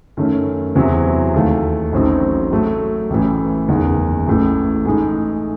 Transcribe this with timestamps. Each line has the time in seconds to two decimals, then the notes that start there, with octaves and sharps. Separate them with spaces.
0.17 F#2 D#3 A3 C#4
0.75 E2 C3 F#3 C4 E4
1.34 D#2 D#3 A3
1.93 A1 A2 F#3 C4 D#4
2.51 A2 F#3 A3
3.10 A1 A2 E3
3.68 F#1 E2 D#3
4.27 A1 A2 E3
4.85 A2 G#3 D#4